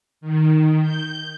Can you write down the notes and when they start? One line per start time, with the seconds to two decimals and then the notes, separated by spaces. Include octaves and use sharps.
0.21 D#3
0.81 G6